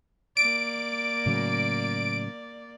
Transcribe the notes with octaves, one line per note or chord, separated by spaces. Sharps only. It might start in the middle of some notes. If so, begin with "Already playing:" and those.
A#3 D5 D7
A2 C#3 F#3